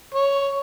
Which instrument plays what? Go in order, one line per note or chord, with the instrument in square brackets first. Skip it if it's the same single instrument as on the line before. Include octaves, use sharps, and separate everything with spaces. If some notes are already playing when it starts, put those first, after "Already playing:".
[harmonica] C#5